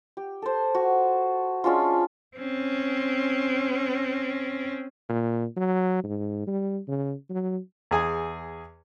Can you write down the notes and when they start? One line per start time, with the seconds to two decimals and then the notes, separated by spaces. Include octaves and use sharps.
0.17 G4
0.42 A4 C5
0.75 F#4
1.64 G#3 C#4 D4 F4
2.37 C4 C#4
5.09 A#2
5.56 F#3
6.04 G#2
6.47 G3
6.88 C#3
7.30 F#3
7.91 E2 G#4 G#5